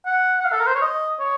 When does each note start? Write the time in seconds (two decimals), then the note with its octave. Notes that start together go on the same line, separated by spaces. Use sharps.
0.06 F#5
0.39 F#5
0.44 F5
0.52 A4
0.60 A#4
0.67 C5
0.75 C#5
0.81 D#5
1.19 C#5